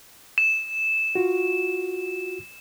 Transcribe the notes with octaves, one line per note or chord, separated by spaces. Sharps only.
E7
F4 F#4